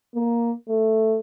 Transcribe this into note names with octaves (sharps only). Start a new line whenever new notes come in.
A#3
A3